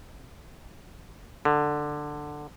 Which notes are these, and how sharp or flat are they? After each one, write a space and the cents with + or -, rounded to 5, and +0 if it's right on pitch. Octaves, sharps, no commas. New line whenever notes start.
D3 +10